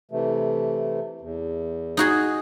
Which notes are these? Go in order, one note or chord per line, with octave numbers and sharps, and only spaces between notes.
C3 E3 A3
E2
D#4 F#4 G#4